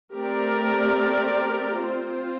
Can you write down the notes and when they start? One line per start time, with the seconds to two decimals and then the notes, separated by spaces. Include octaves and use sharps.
0.13 A3 C4 G4 A#4 D5
1.77 C4 F4 C5